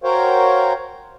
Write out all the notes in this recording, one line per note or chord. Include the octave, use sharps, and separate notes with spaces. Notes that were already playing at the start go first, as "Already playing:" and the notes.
F#4 A#4 C5 C#5 F5 G5